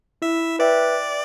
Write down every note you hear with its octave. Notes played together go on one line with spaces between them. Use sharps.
E4 E5
B4 D5 E5 G5